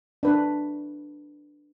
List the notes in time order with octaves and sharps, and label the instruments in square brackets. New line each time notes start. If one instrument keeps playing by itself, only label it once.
[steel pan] D4 B4